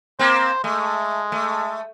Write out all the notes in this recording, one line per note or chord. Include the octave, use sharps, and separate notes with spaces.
A#3 C4 C5
G#3 A3
A3